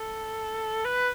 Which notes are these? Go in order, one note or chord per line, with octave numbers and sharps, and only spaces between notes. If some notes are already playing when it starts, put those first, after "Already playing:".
Already playing: A4
B4